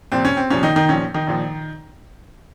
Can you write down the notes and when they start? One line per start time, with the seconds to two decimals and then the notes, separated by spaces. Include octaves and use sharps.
0.12 C2 A#2 F3 C4
0.25 C#4
0.37 C4
0.50 C2 A#2 F3 C#4
0.63 D#3 D#4
0.76 D#3 D#4
0.89 A#1 A#2 F3 C#4
1.14 D#3 D#4
1.27 A#1 A#2 F3